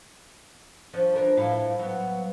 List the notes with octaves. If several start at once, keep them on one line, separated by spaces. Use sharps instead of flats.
F3 C#4 D4
E3 D4 A#4
A2 E4 F5
F#3 B3